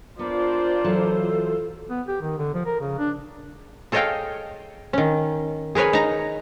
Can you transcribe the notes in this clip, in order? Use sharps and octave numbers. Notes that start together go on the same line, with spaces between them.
B3 D4 F4 A#4 C5 D5
E3 F#3 A4 A5
B3
G4
D#3
D3
F3
A#4
C#3
D4
G#4 A4 C#5 D#5 F5 G5
D#3 C#4
G#4 A#4 B4 C#5 G#5
D#4 A#5